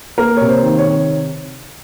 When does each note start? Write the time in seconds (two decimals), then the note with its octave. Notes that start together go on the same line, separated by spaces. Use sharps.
0.18 A#3 A#4
0.37 C3 C#5
0.48 C5
0.63 D#3
0.78 C#5
0.85 C3